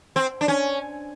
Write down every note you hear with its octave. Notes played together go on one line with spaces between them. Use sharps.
C4
D4
C#4